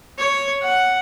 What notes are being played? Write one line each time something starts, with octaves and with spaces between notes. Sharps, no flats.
C#5
F#5